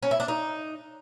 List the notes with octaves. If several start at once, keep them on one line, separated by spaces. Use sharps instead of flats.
C#4
E4
D4
D#4